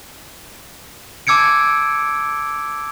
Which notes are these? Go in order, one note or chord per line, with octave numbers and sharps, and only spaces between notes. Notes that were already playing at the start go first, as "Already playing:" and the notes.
A5 D6 E6 G#6 C#7 D7